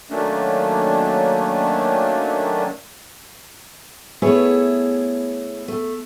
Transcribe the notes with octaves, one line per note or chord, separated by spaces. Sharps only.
D#3 F#3 A3 A#3 C#4 D4
A3 B3 E4 G#4 C#5
A3